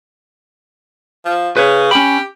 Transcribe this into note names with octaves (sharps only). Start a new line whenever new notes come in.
F3
C#3 B4 C#5
C#4 G4 B5